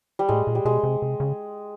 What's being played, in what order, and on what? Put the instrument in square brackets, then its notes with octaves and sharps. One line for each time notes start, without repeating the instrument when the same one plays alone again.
[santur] G3
[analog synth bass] A2 [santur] G#3
[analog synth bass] A#2
[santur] G3
[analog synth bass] B2 [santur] G#3
[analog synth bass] C3
C3
C#3